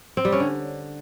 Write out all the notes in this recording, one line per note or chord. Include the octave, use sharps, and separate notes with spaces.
C4
G3
C#4
D3